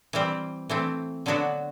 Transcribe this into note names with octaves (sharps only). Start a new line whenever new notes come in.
E3 G3 C4
E3 A3 C4
D3 F#3 B3 D4 F#4